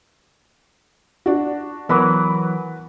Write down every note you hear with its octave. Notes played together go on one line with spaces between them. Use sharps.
D4 F#4
E3 F#3 B3 A#4 B4